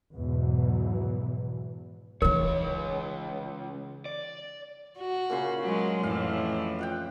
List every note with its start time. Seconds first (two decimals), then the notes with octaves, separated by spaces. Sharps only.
0.14 E2 G#2 B2 E3 F#3
2.22 C#2 E3 D#4 A#4 C#5
4.06 D5
4.98 F#4
5.30 A#2 C#3 C6
5.62 F#3 G#3
6.03 F2 A2 E3 F5
6.79 F4 F#5 G5